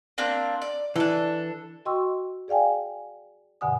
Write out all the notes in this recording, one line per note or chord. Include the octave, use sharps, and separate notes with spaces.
A#3 C4 D4
D5
E3 D4 A4
F#4 D#5 G5 C6 C#6 E6
G#4 D5 F5 G5 G#5
G2 B2 D3 F#5 G#5 D#6